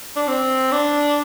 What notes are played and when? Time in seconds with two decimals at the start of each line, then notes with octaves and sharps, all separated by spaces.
0.16 D4
0.28 C4
0.72 D4